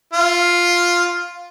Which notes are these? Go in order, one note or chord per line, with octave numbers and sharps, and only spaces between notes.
F4